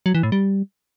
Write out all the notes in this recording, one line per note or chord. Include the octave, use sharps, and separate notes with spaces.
F#3
E3
A2
G3